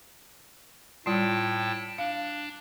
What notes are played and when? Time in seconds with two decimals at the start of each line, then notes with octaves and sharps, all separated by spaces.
1.06 A2 G3 F4 G5 A5
1.98 D4 F5